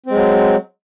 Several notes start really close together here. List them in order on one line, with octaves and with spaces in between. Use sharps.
C4 G#3 F#3